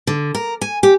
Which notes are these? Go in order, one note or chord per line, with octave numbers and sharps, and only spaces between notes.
D3
A#4
G#5
G4